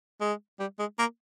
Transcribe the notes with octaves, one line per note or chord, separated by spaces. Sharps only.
G#3
G3
G#3
A#3